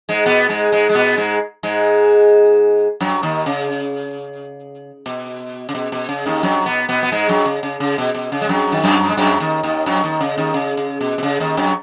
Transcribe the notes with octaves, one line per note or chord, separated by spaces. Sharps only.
G#2 G#3
B2 B3
G#2 G#3
G#2 G#3
G#3
B2 B3
G#2 G#3
G#2 G#3
F#2 F#3
D#2 D#3
C#3
B2
C#3
B2
B2
C#3
D#2 D#3
F#2 F#3
B2 B3
B2 B3
B3
G#2 G#3
F#2 F#3
C#3
C#3
C#3
B2
B2
C#3
G#3
F#2 F#3
D#3
F#2 F#3
G#3
F#2 F#3
D#2 D#3
D#2 D#3
F#2 F#3
D#2 D#3
C#3
D#2 D#3
C#3
C#3
B2
B2
C#3
D#2 D#3
F#2 F#3